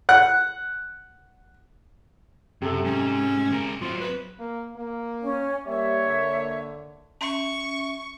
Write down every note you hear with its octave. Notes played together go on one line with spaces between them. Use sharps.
F#5 F#6
F#2 C3 A4
G#2 C#4
G#3 A#4
F#3 C4 F4
B4
A#3
A#3
C#4
G3 A#3 C#5 E5
D3
C#4 E5 C#6